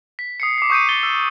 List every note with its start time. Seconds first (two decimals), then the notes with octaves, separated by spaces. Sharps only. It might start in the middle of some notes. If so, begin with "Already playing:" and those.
0.19 B6
0.40 D#6 C7 C#7
0.58 D6 C7
0.70 C#6 D#6 G6 C#7 D#7
0.89 A6 G7
1.03 E6